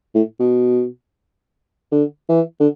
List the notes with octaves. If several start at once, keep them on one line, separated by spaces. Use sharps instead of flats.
A2
B2
D3
E3
D3